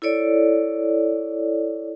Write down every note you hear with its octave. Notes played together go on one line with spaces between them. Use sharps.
E4 A4 C#5 D5